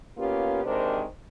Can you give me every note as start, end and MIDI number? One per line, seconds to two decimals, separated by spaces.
0.18 0.62 58
0.18 0.62 59
0.18 0.62 61
0.18 0.62 65
0.18 0.62 67
0.64 1.04 48
0.64 1.04 51
0.64 1.04 56
0.64 1.04 62
0.64 1.04 70
0.64 1.04 72